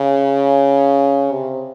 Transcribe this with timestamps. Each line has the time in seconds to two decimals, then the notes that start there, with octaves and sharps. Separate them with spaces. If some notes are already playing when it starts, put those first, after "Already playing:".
Already playing: C#3
1.32 C3